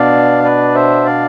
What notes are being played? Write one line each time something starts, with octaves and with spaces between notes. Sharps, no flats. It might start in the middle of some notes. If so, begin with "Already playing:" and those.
Already playing: B2 B3 D4 D5 F5
B4 D5
C5 E5
D5 F5